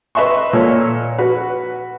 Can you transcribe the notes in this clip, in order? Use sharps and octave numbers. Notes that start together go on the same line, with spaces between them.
B4 D#5 E5 C6 C#6
A#2 A4 C#5
F#4 B4